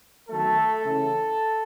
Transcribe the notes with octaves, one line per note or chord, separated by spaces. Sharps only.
D#3 F#3 A3 B3 A4
C#3 E3 A3 C#4